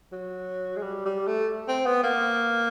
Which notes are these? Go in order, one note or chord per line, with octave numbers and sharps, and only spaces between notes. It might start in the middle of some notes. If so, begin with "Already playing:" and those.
F#3
G#3
G3
G3
A3
C4
B3
A#3